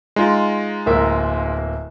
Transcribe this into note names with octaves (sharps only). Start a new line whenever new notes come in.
G#3 D#4 F4
D1 A#3 E5